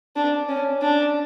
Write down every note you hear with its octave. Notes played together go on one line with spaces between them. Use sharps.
D4
C#4
D4